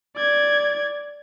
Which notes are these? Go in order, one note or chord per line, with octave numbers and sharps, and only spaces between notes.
D5 G#6